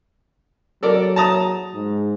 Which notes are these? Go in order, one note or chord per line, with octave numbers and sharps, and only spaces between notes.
F#3 A4 A#4 D5
A5 A#5 D#6
G#2